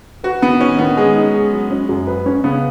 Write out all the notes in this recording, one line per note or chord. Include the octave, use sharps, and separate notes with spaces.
F#4 B4
D#3 B3
C#4 D#4
D#3 B3
G#3 G#4
D#4
G#4
F#3
C#4
F#2
B4
C#4
C#3 B3